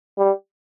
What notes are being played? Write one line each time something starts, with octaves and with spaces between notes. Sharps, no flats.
G3